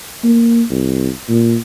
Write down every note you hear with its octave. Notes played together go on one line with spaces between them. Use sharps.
A#3
C2
A#2